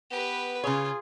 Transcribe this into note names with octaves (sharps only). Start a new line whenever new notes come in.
B3 G4 B4
C#3 F4 G#4 C#5